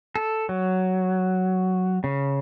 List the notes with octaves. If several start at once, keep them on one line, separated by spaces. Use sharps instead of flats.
A4
F#3
C#3